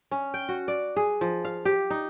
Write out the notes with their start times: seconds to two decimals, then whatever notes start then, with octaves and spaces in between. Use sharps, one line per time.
0.11 C#4
0.34 G5
0.49 F#4
0.68 D5
0.97 G#4
1.21 F3
1.45 F5
1.65 G4
1.90 D#4